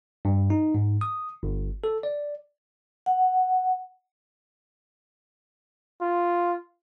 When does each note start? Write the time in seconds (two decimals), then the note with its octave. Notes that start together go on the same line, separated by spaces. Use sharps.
0.25 G2
0.50 D#4
0.75 G#2
1.01 D#6
1.43 G1
1.84 A4
2.03 D5
3.06 F#5
6.01 F4